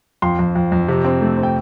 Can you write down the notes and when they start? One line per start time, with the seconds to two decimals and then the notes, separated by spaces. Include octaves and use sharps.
0.22 F2 C6
0.39 F2
0.55 F2
0.72 F2
0.88 C3
1.05 C4
1.21 A3
1.37 C4
1.43 G5